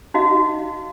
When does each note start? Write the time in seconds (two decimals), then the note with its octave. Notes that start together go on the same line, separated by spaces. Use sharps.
0.14 D#4 F#4 D#5 F5